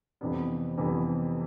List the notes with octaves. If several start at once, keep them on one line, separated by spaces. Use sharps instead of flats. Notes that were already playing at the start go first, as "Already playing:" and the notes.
F2 C3 E3 G3 B3
F2 C3 E3 G3 B3